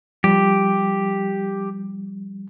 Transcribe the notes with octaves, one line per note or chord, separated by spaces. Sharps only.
F3 G3 G4